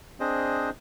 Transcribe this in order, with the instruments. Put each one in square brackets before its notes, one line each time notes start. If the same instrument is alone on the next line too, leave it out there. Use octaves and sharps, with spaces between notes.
[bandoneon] C4 D4 G#4 C5 D#5